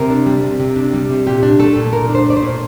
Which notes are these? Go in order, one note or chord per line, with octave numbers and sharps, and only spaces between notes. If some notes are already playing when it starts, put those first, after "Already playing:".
Already playing: C3 A#4
D4
G3
C3
C3
D4
G3
C3
A#2 G4
D4
A3 A4
A#2
A#2 A#4
D4
C5
A3 D5
C5
A#2